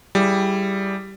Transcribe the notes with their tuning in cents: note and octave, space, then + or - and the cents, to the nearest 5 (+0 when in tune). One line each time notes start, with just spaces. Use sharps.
G3 -10 E4 +10 G#4 -5